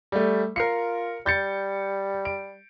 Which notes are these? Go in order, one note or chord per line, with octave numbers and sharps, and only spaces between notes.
G3 A3
F4 A#4 C7 C#7
G3 G6 A6 C#7
D7